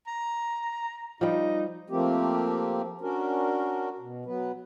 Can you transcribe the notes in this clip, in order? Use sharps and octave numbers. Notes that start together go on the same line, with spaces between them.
A#5
F3 G3 D#4
F3 A3 A#3 C4 G4
C#4 D4 F#4 A#4
B2
F#3 B3 B4